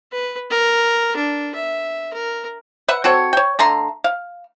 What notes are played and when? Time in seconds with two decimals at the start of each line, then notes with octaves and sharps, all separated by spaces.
0.12 B4
0.50 A#4
1.16 D4
1.55 E5
2.13 A#4
2.88 B4 E5 F#5
3.04 C4 F#4 A4 C#5
3.33 C#5 G5
3.59 D3 A3 A#5 C6
4.04 F5